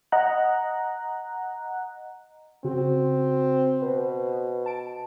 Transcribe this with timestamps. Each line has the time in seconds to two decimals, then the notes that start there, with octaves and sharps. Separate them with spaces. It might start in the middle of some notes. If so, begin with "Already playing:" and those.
0.12 D#5 F#5 A#5 F#6
2.64 C#3 C4 F#4
3.82 B2 B4 C5
4.66 A5 D7